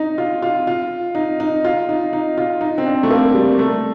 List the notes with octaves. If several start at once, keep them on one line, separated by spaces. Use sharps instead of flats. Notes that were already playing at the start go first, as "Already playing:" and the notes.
Already playing: D#4
F4
F4
F4
D#4
D#4
F4
D#4
D#4
F4
D#4
C4
D4
A3
A#3
G3
A3